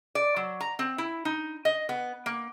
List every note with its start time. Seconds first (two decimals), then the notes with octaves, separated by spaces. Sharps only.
0.15 D5
0.36 F#3
0.61 A#5
0.79 C4
0.98 E4
1.25 D#4
1.65 D#5
1.89 B3
2.26 A#3